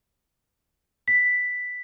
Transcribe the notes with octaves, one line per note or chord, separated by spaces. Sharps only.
B6